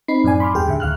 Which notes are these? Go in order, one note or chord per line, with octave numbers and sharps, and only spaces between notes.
C4 D#4 B5 C7
F#2 A2 D5 G#5
B5 C6 D6 F6
E2 G#2 G4 G#4 G5
C#2 A2 D3 E5
D2 F5 F6 F#6